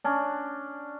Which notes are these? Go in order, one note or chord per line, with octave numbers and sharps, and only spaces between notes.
C#4 D4